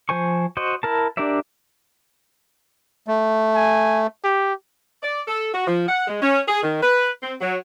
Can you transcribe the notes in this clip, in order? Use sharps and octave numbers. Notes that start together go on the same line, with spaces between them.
F3 C5 G#5 C#6
F#4 C5 D#5
E4 A#4 A5
D4 G4 A#4 D5 E5
A3
G#5
G4
D5
A4
F#4
F3
F#5
G#3
C#4
G#4
D#3
B4
C4
F#3